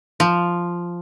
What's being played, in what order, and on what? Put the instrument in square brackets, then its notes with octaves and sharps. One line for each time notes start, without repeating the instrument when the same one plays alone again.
[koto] F3